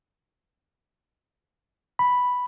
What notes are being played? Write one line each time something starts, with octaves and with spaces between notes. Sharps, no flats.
B5